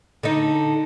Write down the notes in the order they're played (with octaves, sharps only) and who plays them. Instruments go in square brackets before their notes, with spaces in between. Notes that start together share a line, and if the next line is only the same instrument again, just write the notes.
[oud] D3 D#4